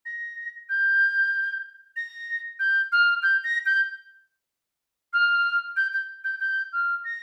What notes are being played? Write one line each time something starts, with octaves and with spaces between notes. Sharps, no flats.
A#6
G6
A#6
G6
F6
G6
A#6
G6
F6
G6
G6
G6
G6
F6
A#6